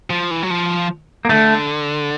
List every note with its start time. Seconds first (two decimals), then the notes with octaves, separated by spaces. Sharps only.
0.10 F3
0.31 E3
0.43 F#3
0.51 F3
1.25 A#3
1.29 D3 A3